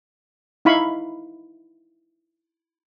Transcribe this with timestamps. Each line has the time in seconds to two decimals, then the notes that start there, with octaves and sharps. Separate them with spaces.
0.65 D#4 E4 F5 B5 C#6